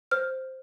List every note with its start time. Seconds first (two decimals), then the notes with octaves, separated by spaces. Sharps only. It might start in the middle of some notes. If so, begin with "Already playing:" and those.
0.11 C5 F6